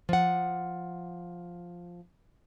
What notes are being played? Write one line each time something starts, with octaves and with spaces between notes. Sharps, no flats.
F3 F#5